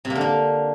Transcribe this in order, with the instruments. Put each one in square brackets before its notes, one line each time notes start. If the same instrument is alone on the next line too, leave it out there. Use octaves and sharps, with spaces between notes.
[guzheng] C3
A#3
D3
A#3